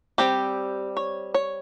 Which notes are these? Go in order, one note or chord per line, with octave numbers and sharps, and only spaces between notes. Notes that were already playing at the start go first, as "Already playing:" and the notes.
G3 C4 G4
C#5
C#5